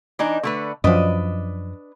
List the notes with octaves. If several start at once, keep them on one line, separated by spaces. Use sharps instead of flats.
E3 D4 D#4
D3 A3 B4
F#2 F3 D4 B4 D#5